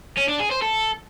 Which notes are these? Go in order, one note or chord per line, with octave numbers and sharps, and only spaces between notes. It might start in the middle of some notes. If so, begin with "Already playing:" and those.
C#4
D4
G#4
C5
A4